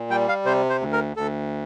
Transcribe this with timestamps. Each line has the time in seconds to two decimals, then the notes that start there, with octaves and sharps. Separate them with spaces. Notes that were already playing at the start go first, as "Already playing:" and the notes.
Already playing: A#2
0.10 G3 G5
0.29 F5
0.45 C3 C5
0.70 C5
0.81 D2
0.93 A#4
1.17 D2 A4